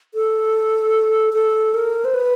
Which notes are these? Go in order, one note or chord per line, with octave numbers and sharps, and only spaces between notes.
A4
A4
A#4
C5
B4